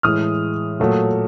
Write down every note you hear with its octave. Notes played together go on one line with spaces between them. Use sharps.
A2 E3 G#3 D#6 F6
A#2 F#3 A3